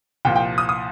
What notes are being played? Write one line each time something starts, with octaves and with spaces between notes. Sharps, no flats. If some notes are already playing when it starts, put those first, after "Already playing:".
C2 A#2 F3 G5
G5
D#6
D#6